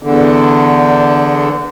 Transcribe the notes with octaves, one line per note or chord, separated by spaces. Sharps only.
E2 D3